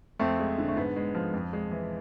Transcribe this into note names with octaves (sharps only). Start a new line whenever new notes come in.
F2 A3 C4
G#3
D3
A3
G#2 B3
G#3
F3
F2
G#3
E3